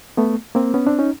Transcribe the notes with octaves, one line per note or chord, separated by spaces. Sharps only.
A3 B3
A#3 C4
B3 C#4
C4 D4
C#4 D#4